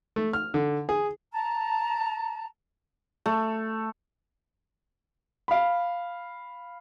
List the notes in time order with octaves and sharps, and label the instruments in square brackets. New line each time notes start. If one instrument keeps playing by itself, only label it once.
[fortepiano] A3
F6
D3
G#4
[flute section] A5 A#5
[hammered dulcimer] A3
[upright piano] F5 B5